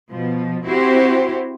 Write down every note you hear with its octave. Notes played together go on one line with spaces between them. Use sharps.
B2 F3
C4 E4 F#4 G4 C5